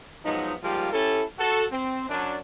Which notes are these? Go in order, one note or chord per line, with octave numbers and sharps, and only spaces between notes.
F3 F#3 G#3 B3 D#4
G#2 F3 G3 A#3 F4 G4
C#4 E4 G4 A4
F#4 A4
C4
F#2 D4